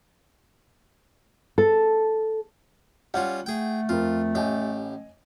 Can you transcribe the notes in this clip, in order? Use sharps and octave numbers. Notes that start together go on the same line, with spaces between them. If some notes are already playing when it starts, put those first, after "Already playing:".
A4
G3 C#4 F4 F#5
A3 G#4 G5
F2 F4 A#4
A1 G4 D#5 G#5